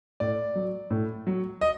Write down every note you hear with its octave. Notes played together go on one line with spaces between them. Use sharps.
A2 D5
F#3
A2
F#3
D#5